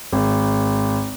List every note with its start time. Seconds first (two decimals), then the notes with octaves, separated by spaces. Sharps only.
0.13 G#1